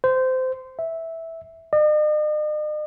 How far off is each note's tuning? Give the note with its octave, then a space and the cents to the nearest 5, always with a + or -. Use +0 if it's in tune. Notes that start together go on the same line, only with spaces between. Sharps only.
C5 -20
E5 -10
D#5 -45